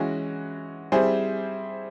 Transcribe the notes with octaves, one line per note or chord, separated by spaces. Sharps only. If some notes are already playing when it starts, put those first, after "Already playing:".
Already playing: E3 G#3 C#4 F#4
G3 C4 E4 G#4 C5